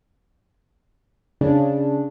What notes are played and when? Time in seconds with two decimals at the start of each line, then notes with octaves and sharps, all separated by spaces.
1.41 C#3 D4